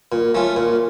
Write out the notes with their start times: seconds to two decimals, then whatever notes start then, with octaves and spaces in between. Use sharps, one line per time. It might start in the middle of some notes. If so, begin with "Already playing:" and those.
0.12 A#2
0.35 A3 C#4 F4
0.56 A#2